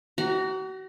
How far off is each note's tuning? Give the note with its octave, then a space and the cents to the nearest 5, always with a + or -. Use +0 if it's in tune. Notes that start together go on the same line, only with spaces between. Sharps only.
F#4 +40 F#5 +0 A#5 -10